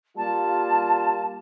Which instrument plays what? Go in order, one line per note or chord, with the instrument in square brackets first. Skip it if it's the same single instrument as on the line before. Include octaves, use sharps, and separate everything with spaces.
[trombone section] G3 A#3 F4 [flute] A5